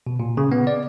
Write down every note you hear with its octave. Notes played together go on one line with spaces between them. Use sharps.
B2
A#2
C#3
B3
D5